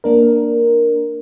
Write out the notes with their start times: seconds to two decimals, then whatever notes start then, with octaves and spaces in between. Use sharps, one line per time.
0.04 A#3 D4 A#4